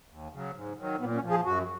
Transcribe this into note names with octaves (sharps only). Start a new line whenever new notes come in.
D#2
C#3 F#3
G#2
D#3 F#3
A#2 B3
C#4
F3
G#4
F#2 F#4